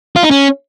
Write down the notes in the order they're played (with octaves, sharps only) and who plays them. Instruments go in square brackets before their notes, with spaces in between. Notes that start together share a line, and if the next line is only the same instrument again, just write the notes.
[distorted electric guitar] F4
D#4
C#4